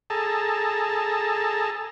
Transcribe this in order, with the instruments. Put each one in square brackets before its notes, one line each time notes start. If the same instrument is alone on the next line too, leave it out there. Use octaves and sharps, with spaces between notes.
[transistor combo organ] G#4 A4 A5 A#5